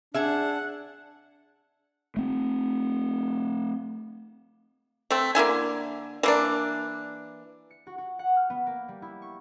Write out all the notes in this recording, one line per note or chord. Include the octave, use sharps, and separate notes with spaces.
D4 G#4 E5 F#5
A3 C4
A3 C4
D3 A#3 E4 G#5
E3 A#3 D4
C#7
F#4
F#4
F#5
F6
B3
A#3
G3
E4
C#6